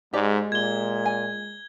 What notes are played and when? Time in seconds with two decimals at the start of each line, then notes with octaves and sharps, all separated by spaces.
0.13 G#2 G#3 G4 D5
0.52 A#2 G#6 G7
1.06 G#5